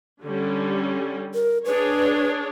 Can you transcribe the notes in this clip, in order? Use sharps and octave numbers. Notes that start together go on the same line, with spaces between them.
D3 G3 C#4
A#4
D4 G#4 B4 C#5